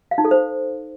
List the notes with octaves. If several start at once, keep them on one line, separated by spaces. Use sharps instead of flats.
F5
D#4
A4
C5